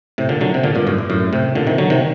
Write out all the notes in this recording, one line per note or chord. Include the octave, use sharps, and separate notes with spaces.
A2 C3
A#2 D3
D3 F#3
C3
A#2 D3
G2 A#2
F#2 A2
G2
F#2 A2
A2 C3
A#2 D3
C3 D#3
D3 F#3
C3 D#3